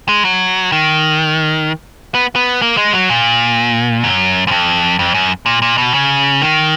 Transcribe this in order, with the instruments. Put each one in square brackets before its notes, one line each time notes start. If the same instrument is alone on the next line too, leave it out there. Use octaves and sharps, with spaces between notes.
[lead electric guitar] G#3
F#3
D#3
B3
B3
A#3
G#3
F#3
A#2
F#2
F#2
F2
F2
F#2
A#2
A#2
B2
C#3
D#3